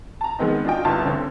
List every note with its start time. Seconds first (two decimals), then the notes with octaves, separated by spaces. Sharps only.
0.21 A5 A#5
0.39 D#3 G#3 B3 C4 D#4
0.65 D4 F4 F#4 D#5 G5
0.85 G1 C2 F4 A5 C6
1.05 D3 A3 C4 C#4